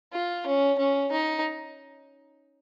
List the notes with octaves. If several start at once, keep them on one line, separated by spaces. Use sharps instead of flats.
F4
C#4
C#4
D#4